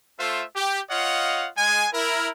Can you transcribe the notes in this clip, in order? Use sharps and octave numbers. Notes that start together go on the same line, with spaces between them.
A3 F4 A4 C5 E5
G4
F4 C#5 D#5 F5 F#5
G#3 G#5
E4 A#4